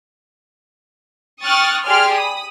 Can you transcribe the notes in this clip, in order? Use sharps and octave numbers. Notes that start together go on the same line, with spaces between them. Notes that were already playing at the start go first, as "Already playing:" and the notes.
G5 C#6 D#6 F6 F#6 A6
G4 G#4 D5 G#5 C6 F6
B5 D#6